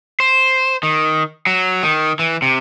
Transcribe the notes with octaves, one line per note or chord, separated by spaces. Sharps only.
C5
D#3
F#3
D#3
E3
C3